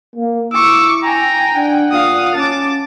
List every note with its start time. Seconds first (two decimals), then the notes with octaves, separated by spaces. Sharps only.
0.16 A#3
0.53 E4 C#6 D6 E6
1.04 G5 G#5 A#5
1.55 D4 F#5
1.91 A#2 F5 D#6
2.35 C#4 A5 D6 A6